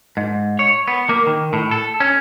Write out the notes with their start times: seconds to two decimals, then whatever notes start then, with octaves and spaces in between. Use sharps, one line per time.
0.17 G#2
0.59 C#5
0.88 B3
1.09 A#3
1.27 D#3
1.53 A2
1.71 A4
2.00 C#4